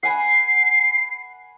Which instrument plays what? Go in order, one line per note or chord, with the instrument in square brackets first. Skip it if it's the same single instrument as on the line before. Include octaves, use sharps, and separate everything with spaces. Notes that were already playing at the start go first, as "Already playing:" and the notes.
[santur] F#5 G#5 B5 [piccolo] C7